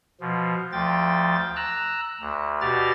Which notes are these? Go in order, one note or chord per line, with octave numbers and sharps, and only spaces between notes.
B2 F3
D2 F3 G5 A6
A#5 E6 F#6
D2
B2 F#4 G4 D5 F6 A6